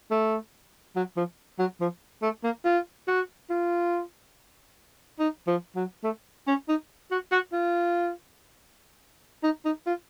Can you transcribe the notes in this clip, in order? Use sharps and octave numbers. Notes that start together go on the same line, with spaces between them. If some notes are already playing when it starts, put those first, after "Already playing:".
A3
F#3
F3
F#3
F3
A3
A#3
F4
F#4
F4
D#4
F3
F#3
A3
C#4
D#4
F#4
F#4
F4
D#4
D#4
F4